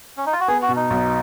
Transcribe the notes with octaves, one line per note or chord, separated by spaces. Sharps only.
C#4
D#4
F4
F#4
B3 G#4
F#4
B2
D#4
B1